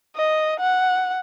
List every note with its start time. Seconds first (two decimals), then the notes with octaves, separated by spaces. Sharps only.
0.16 D#5
0.60 F#5